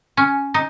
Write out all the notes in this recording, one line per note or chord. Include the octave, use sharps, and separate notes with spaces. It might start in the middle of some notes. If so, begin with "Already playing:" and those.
C#4
D#4